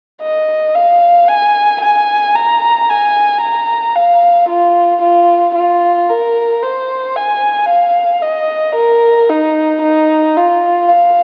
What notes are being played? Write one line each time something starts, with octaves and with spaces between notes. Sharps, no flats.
D#5
F5
G#5
G#5
A#5
G#5
A#5
F5
F4
F4
F4
A#4
C5
G#5
F5
D#5
A#4
D#4
D#4
F4
F5